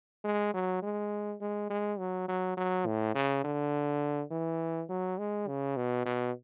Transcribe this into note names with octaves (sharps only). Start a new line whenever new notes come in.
G#3
F#3
G#3
G#3
G#3
F#3
F#3
F#3
A2
C#3
D3
E3
F#3
G#3
C#3
B2
B2